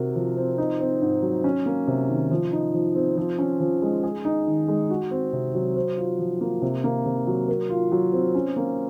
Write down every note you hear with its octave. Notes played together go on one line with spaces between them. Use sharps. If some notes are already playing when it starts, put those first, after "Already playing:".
Already playing: C3 F#4 A#4
F3
C4
D#4
C4
G#2
F#3
C#4
A#3
C3
D#3
F3
D#4
F3
C4
F3
C#4
F3
G#3
G#4
D#4
D#3
G#3
F#4
C4
C3
F#3
C5
F4
F3
A#3
C3
A#3
C3
F#3
A#4
F4
F#3
C4
C#4
A#3